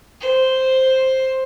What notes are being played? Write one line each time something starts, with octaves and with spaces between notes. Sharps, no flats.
C5